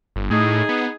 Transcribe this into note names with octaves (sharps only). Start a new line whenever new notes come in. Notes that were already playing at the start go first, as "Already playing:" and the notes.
G1
A2 D#4 G#4
B3